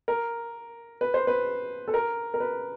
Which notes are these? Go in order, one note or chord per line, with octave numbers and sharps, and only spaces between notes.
A#4
B4
C5
B4
A4
A#4
A#4
B4